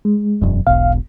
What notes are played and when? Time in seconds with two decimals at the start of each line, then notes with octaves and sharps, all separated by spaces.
0.05 G#3
0.42 E1 F#2
0.67 E1 B1 B2 F5